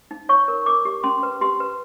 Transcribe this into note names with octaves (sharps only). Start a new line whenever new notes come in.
D#4
C#5 C#6
A#4
A#4 D6
G4
C#4 C6
B4
G4 C6
B4